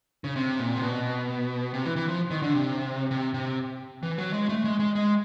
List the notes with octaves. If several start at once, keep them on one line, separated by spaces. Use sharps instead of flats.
C#3
C3
A#2
C3
B2
C3
E3
E3
F3
D#3
D3
C3
C3
C3
E3
F#3
G#3
A3
G#3
G#3
G#3